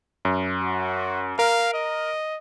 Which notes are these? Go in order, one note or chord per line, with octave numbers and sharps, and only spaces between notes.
F#2
F#4
A#4 F5
D#5